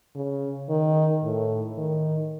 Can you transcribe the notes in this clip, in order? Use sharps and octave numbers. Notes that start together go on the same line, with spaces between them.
C#3
D#3
A2
D#3